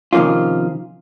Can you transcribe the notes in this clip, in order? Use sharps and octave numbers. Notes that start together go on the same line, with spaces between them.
C3 D#3 F3 A#3 C#4 F4